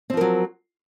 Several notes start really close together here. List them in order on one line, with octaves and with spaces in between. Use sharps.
C4 F3 A#4 F#3